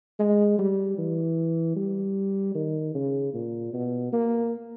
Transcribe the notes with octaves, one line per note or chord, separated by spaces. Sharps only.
G#3
G3
E3
G3
D#3
C#3
A#2
B2
A#3